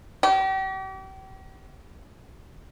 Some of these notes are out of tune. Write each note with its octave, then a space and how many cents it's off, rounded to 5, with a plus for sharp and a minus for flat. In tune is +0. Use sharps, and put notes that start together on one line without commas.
G4 -40